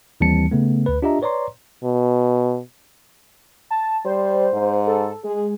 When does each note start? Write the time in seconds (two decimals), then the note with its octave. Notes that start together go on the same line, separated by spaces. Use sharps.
0.21 D#2 E3 G3 C4 A5 C#7
0.51 C#3 A3 B3
0.86 D2 B4
1.02 D4 F4 G4 D#5 E5 A#5
1.22 B4 C#5 D5 A#5 C6
1.84 B2
3.71 A5
4.05 G3 C5
4.54 G#2
4.87 A4
5.24 G#3 G#4